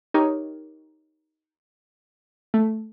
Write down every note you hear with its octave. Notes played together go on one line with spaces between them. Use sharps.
D#4 G4 A#4 C#5
A3